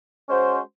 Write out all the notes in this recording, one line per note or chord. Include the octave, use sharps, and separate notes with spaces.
G#3 C#4 F#4 C5